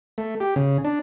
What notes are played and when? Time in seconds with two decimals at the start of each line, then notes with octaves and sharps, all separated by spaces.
0.18 A3
0.40 G4
0.56 C#3
0.85 D4